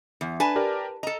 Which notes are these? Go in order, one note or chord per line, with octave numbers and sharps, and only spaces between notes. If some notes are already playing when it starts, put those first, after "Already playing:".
E2
D4 B4 G#5 A5
G4 A#4 D5
A4 D#5 A#5